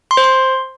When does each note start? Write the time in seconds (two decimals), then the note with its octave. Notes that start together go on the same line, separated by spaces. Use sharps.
0.11 C6
0.17 C5
0.24 C6